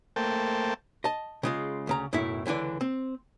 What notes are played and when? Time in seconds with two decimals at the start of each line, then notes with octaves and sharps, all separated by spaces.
0.16 A3 A#3 C5 G5 A5
1.04 D#5 A5
1.43 C#3 G#3 F4
1.87 D2 C#3 A#5
2.13 B1 F#2 A2 A3 E4 E5
2.46 C#2 D3 E3 D4 D5
2.81 C4